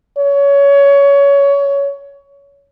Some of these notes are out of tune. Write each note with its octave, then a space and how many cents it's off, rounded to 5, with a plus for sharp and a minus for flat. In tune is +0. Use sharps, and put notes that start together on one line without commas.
C#5 +20